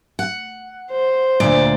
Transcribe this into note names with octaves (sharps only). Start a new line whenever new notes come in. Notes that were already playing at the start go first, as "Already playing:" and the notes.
F#5
C5
D2 A#2 D5